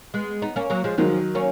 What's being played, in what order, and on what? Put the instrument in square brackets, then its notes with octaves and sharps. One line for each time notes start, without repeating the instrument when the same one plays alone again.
[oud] G#3 B3
B3 D#4
A#3 C#4
F#3 A#3
F3 G#3
[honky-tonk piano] D#3 F#3 [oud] F3 G#3
[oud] A#3 C#4